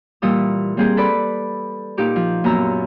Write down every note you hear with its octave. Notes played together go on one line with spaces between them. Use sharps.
A#2 E3 G3 D#6 E6
G3 A#3 C4 G#4 C5
A4 B4 D5 B5
A#2 D#4 G4 D6
F3
F#2 A#2 B3 A#5 E6